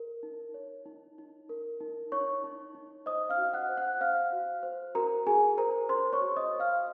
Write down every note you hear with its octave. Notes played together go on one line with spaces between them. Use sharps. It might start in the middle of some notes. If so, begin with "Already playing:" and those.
Already playing: A#4
D#4
C#5
D#4
D#4
A#4
D#4
D#4 C#5 C#6
D#4
D#4
C5 D#5 D#6
F5 F6
F#4
F#5 F#6
C5
F#5 F#6
C5 F5 F6
F#4
C5
F#4 A#4 A#5
F#4 G#4 G#5
A#4 C5 A#5
C5 C6
C#5 C#6
F#4
D#5 D#6
C5
F5 F6